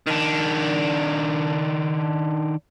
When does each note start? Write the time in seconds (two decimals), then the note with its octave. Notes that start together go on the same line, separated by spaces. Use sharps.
0.07 D#3 D4